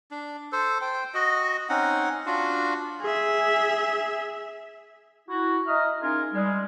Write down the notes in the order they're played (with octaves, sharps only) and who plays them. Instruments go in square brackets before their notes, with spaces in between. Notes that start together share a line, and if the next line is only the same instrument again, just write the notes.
[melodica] D4
A4 C5
C5 G5
F#4 D#5
C4 C#4 D#4 F#5
D4 F4 F#4
[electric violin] G#4 E5
[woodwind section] E4 F#4
D#5 E5 A#5 D#6 F6
C#4 D#4 F4 G#4 A#4
G3 G#3